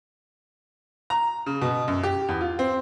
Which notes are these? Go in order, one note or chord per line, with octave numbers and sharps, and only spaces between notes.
A#5
C#3
B2
F#2
G4
E2
F4
C4